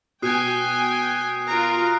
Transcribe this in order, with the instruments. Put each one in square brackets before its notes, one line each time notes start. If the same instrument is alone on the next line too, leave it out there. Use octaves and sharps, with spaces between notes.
[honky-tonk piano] B2 [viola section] G5 G#5 [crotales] D#6 F#6 C7
[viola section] F4 A#4 [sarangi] A#5 [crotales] F#6 D7